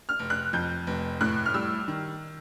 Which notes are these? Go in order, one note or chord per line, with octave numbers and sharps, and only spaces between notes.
F6
F1
F#6
F2 G6
F1
A2 F#6
F6
G3 E6
D#3